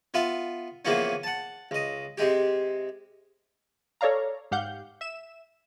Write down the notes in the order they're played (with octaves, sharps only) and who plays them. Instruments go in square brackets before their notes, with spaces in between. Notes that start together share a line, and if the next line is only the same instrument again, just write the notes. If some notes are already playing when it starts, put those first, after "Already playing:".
[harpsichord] B3 F4 E5
C#3 E3 F3 A#3 B3 C#4
F#5 A5
C#2 D#5
C3 G#3 G4
[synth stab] A4 C#5 D5 F5 A#5
G#2 G4 F5 F#5 G6
E5 E7